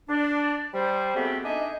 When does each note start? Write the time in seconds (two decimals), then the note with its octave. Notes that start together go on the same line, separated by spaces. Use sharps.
0.08 D4
0.73 G3 C5
1.15 G#3 A3 B3 C4 F#4 G4
1.44 D4 D#4 D#5 E5 G#5